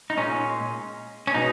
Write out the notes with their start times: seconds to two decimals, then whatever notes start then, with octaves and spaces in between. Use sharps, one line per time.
0.10 D#4
0.17 A#2 G#3 C#4
1.27 C#4
1.34 B2 G#3 D#4